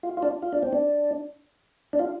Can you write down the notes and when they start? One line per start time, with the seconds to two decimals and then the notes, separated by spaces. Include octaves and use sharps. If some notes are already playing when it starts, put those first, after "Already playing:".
0.03 F4
0.17 F4
0.23 D4
0.42 F4
0.53 D4
0.63 C4
0.73 D4
1.93 D4
1.99 F4